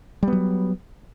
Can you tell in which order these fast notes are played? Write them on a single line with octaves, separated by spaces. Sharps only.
G3 B3 F#3